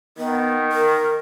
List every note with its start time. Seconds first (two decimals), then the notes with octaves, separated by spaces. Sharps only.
0.18 D#3 B3
0.72 A#4